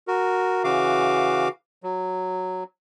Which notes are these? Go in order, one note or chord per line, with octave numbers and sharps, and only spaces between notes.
F#4 A#4
C#3 E3 F#4 F5 D6
F#3